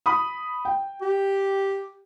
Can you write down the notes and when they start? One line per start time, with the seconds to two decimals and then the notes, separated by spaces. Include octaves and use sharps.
0.06 B5 D#6
0.65 G5
1.01 G4